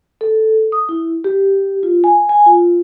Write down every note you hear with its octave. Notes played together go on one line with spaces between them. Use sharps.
A4
D#6
E4
G4
F4
G#5
G#5
F4